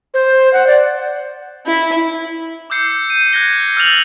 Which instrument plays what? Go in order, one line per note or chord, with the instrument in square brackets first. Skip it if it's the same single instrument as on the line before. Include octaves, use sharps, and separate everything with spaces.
[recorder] C5
F#5
D5
[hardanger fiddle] E4
[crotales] D6 E6 G6 C7 C#7
C#7 D#7
F#6 G#6 A#6 G7
E6 F6 G6 A6 F7 F#7